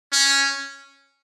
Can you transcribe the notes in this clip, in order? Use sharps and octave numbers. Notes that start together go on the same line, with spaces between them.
C#4